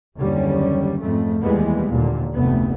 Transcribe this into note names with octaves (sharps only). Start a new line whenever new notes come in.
F#1 D#2 D3 G3 C#4
F2 G#2 A3
D#2 E3 G3 G#3 B3
D#2 A#2 D3
F1 D2 A3 B3